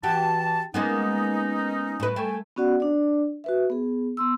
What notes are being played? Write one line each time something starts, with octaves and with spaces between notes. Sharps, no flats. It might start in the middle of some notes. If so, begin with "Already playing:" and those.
E3 F#4 G4 A5
G#3 A#3 B3 C#4 D#4
A2 B4
A3 G5 G#5
B3 C#4 F#4 D5 F#5
D4 D5
F#4 B4 E5
B3 G#4
B3 C6 E6